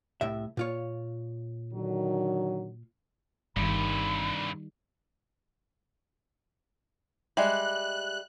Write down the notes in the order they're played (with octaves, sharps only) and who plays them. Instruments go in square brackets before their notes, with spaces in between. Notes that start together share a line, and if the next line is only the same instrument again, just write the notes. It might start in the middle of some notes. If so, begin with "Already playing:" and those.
[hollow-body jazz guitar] C2 A2 E5
A#2 F4 C#5
[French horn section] D3 D#3 F#3
[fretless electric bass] G1 [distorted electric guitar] G2 C3 [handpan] D#3 G3 [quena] B5
[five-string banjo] G3 G#3 [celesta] E5 [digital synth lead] F#6